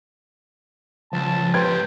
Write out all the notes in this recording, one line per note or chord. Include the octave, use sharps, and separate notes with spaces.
C#2 F3 A5
G#2 G4 B4 G5 C6 G#6